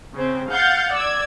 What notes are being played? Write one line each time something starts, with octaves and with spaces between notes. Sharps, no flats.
C#3 C4
F5 F#5 G6 A6
D5 E6 G#6